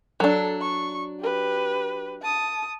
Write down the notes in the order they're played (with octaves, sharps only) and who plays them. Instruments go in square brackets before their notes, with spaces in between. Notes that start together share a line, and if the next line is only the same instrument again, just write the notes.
[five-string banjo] F#3 D4 [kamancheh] A4
[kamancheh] C#6
G4 B4
A5 D#6